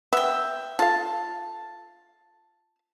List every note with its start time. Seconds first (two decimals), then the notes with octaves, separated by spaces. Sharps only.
0.13 B3 E5 G5
0.79 F4 A4 F5 A5